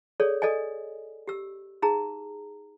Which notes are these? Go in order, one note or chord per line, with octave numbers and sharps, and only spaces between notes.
G#4 A4 C#5 D5
A4 D5 D#5 G#5
G4 E6
D#4 G#4 A#5